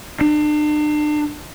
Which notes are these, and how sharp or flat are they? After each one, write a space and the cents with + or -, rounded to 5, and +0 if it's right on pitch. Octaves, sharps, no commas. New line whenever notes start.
D4 +40